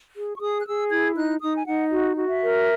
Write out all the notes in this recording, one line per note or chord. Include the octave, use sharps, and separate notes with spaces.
G#4
C#6
G#4 D#6
F#6
G#4 E6
E4 G#6
D#4 F#6
D#4 D#6
G#5
D#4 F#5
F#4
F#4
E5
A#4